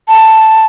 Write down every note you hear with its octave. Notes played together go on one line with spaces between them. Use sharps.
A5